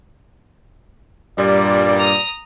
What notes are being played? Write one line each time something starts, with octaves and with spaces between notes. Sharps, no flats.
G2 A#2 G3 D5
A#5 D#6